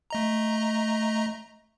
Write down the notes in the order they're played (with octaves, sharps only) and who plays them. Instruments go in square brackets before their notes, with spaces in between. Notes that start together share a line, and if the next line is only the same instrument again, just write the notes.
[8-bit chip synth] A3 D#5 A#5